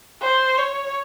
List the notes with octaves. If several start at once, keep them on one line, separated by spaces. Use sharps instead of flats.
C5
C#5